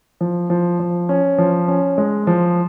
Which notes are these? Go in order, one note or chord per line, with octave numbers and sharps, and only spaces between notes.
F3
F3
F3
C#4
F3
C#4
G#3
F3